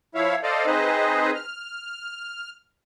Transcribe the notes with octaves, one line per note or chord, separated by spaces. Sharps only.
F3 E4 C#5 E5 F5
A4 C5 D5 D#5 F5
C4 D#4 G#4 B4 C5 D#5
F6